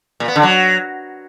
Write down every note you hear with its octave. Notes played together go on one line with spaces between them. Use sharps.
A#2
B3
D3
F#3